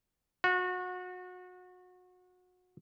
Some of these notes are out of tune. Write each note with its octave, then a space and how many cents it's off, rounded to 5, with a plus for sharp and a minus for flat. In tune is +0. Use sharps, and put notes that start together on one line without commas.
F#4 -30